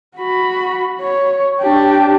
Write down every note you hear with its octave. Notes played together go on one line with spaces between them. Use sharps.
F#4 B5
C#5
D4 G4